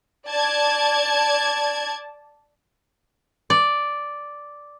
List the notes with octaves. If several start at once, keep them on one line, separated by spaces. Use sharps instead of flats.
D5 A5 G#6
D5